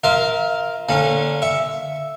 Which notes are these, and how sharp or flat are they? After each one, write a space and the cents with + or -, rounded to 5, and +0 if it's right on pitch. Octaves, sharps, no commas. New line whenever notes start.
F4 +0 A#4 +0 E5 -35
D3 +0 A#3 +0 C#4 -25
E5 +0 C#6 +0